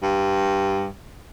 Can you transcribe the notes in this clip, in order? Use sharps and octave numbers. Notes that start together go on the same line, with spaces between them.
G2